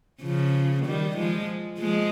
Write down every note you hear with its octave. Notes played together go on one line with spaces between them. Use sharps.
C#3 F3
D#3 G3
F3 G#3
F3 G#3